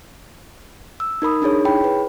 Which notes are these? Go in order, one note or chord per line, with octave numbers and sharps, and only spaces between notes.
E6
D#4 A#4 B5 D#6
D4 D#4 G#4 C#5
E4 G#4 C#5 G5 B5
B4